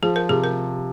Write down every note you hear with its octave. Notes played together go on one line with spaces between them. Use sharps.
F3 G#4
A#4
C3 G#4
A#4